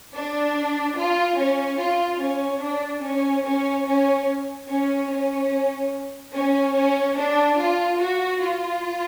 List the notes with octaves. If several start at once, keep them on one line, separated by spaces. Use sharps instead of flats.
D4
F4
C#4
F4
C#4
D4
C#4
C#4
C#4
C#4
C#4
C#4
C#4
D4
F4
F#4
F4